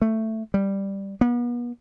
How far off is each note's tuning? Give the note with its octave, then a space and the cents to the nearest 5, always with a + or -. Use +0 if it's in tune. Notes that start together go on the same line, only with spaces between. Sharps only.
A3 +10
G3 +5
B3 -40